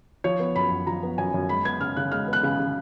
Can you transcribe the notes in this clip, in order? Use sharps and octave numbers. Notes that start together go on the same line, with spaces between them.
F3 C#5
B3
F#2 B5
F#2
F3 A#5
B3
F#2 G#5
F#2
G#3 B5
B3 G#6
C#3 F6
C#3 F#6
G#3 F6
B3
F#6
C#3
C#3